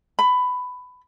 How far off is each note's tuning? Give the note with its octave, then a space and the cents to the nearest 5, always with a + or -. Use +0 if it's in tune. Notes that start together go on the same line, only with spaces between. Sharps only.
B5 +15